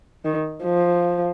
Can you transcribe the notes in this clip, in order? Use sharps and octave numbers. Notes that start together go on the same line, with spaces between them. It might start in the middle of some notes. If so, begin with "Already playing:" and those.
D#3
F3